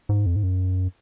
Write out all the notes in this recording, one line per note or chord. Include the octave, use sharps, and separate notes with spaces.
G#2
F2
G#2
F#2